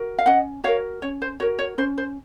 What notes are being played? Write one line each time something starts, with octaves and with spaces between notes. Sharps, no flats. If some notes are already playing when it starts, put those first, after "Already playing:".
Already playing: F#4 A#4
F5
C#4 D#5 F#5
F#4 A#4 C#5 F5
C#4 C#5
C5
F#4 A#4 C#5
C#5
C#4 C5
C5